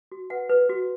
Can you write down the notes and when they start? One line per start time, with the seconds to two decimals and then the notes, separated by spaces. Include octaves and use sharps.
0.12 F#4
0.30 B4 F#5
0.50 B4
0.69 F#4